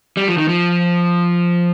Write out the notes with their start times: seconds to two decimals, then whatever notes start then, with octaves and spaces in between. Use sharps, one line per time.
0.17 G3
0.28 F3
0.37 D#3
0.48 F3